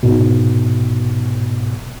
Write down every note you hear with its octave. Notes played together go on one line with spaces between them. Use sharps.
G#2 B2